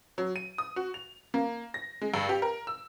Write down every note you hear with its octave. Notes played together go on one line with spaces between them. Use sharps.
F#3
D#7
D#6
F#4
F7
A#3
A#6
G#3
G2
G4
A#4
E6